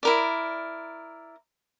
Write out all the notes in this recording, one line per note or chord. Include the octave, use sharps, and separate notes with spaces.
E4 A#4 D5